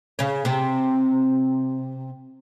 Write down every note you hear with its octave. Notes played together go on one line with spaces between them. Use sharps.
C#3 C#4
C3 C4